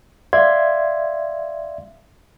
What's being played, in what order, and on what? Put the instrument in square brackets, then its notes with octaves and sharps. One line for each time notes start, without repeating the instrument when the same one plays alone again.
[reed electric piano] D5 E5 F5 C6 G#6